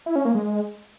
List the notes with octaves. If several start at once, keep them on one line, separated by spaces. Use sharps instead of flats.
E4
C#4
A#3
G#3